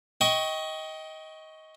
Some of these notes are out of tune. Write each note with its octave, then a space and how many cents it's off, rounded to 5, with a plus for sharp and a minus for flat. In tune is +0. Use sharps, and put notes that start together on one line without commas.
D#5 +20 G5 -5 C#6 +0